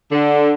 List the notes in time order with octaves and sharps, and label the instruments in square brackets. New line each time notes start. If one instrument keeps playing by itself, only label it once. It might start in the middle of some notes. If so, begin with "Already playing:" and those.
[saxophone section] D3